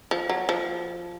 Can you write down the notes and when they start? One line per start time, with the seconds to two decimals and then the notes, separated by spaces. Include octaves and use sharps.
0.11 F3
0.29 F#3
0.49 F3